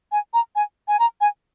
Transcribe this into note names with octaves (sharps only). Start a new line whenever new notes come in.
G#5
A#5
G#5
G#5
A#5
G#5